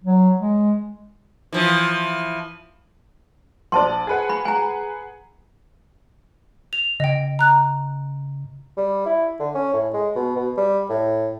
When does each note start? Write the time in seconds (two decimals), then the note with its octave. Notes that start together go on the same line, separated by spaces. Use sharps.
0.04 F#3
0.40 G#3
1.53 E3 F3
3.72 A#1 C5 D5 A5 C6
4.07 G#4 B4 F#5
4.29 B5
4.45 G#5 A#5
6.73 F7
7.00 C#3 D#5 G5
7.39 A#5 F#6
8.77 G3
9.06 E4
9.40 D3
9.55 C#4
9.73 A2
9.94 G#3
10.16 B2
10.36 B2
10.57 G3
10.90 A2